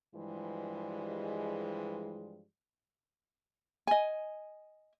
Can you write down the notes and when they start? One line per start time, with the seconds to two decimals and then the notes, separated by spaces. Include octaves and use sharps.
0.15 G2 E3 F3 G3 G#3
3.87 D#5 G#5